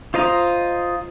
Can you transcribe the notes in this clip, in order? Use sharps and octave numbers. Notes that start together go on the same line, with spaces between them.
F4 C5 D#5 A#5